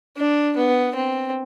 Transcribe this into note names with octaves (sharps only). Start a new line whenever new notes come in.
D4
B3
C4